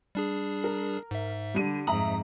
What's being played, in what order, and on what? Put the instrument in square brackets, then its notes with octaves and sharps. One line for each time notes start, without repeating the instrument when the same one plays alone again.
[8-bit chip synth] G3 D4 G#4
[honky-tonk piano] A#4
[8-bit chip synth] G#2 E5
[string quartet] D3 [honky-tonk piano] G3 D#7
[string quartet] F2 G#2 [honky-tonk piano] E5 A#5 F#7 [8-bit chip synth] D#6